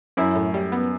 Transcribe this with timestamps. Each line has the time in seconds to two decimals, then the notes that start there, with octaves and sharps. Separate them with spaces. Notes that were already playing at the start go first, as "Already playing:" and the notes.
0.17 F#2 E4
0.35 A2
0.54 G3
0.72 B3